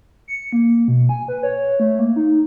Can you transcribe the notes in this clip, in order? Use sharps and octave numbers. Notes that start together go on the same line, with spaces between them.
C#7
A#3
B2
G#5
B4
C#5
A3
A#3
D#4